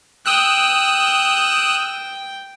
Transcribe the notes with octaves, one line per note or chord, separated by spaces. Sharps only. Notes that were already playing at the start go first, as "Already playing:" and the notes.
G5 D#6 E6 F#6